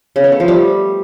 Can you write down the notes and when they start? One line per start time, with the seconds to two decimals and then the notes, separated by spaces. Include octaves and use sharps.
0.16 C#3
0.24 B3
0.32 A3
0.40 F3
0.48 G3